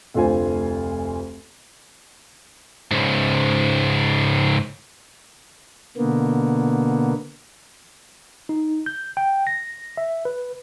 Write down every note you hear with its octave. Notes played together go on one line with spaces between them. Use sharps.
F1 D2 F4 C5 G#5
C#2 G#2
B2 D3 A#3 B3
D#4
G6
G5
A#6
E5
B4